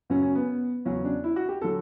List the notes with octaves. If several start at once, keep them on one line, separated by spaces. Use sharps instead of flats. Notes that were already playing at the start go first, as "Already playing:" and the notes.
F#2 C#3 F#3 C#4
C#4
B3
E2 C#3 F#3 C#4
D4
E4
F#4
G4
D3 F#3 A4